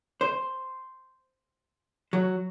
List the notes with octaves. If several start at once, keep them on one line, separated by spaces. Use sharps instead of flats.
C5
F#3